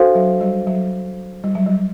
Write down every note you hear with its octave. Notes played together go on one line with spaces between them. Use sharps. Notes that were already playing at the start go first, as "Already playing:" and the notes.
Already playing: D4 F#4 A4 C5 F5
F#3
G3
F#3
G3
F#3
G3